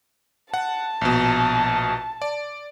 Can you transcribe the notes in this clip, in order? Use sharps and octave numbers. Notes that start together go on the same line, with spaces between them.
F#5 A5
A#1 B2
D5